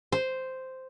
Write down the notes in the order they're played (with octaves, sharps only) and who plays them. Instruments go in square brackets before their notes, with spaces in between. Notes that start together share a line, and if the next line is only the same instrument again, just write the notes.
[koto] C5